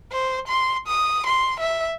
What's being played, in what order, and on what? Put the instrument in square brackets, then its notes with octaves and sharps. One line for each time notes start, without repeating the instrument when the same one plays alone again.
[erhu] C5
C6
D#6
C6
E5